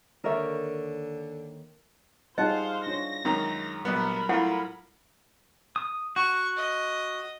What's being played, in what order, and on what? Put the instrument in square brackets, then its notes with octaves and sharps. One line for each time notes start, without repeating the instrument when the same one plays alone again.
[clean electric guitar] D#2 C#5 [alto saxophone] D3 [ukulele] A#4 E5
[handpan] G3 F4 G#4 [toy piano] D#4 D#5 [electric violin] C5 F5 [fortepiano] F#5
[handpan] D4 F4 C#5 [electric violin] A#6
[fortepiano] F#2 D#3 A#5 [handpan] G#3 C#5
[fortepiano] A#1 B3 [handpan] F#3 G3 [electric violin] A#4 B5
[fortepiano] A2 F4 [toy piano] E4 F#5
[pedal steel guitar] D#6
[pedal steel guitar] F#4 [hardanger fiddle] C#6
[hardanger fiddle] D#5